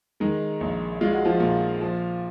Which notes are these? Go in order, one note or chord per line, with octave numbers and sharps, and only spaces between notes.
D#3 G#3 D#4
A#1
G#3 F4
F#4
F3 F4
A#2
F3